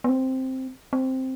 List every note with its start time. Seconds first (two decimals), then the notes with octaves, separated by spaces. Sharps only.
0.04 B3
0.09 C4
0.93 C4